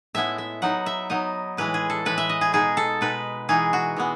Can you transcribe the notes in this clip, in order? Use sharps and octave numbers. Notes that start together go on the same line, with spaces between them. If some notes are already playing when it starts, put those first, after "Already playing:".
A2 G#3 B3 E4 E5
E5
F#3 B3 D#4 F#5
E5
F#3 B3 D#4 D#5
A2 E3 G#3 B4
G#4
A4
A2 E3 G#3 B4
E5
D#5
G#4
B2 G#3 D#4 G#4
A4
B2 G#3 D#4 B4
E3 G#3 B3 D#4 G#4
F#4
E3 G#3 B3